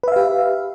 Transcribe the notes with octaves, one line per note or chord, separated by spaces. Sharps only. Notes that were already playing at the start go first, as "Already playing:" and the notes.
G4 B4 E5 F5